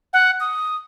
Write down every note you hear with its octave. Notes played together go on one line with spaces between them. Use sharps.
F#5
D#6